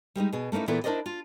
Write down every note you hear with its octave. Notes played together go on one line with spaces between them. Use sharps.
G3 G#3 C4 D#4
B2 G#4
A3 A#3 C#4 D#4 E4
A#2 E3 B3 E4 F4 A4
D4 E4 A#4 C5 D5 D#5
F4